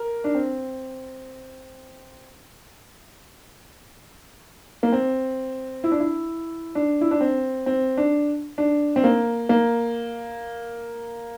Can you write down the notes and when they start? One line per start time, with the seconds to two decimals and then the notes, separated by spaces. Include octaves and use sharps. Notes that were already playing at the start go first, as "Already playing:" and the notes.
Already playing: A#4
0.24 D4
0.35 C4
4.83 A#3
4.93 C4
5.84 E4
5.92 D4
6.00 E4
6.75 D4
7.01 E4
7.11 D4
7.21 C4
7.66 C4
7.97 D4
8.58 D4
8.96 C4
9.04 A#3
9.49 A#3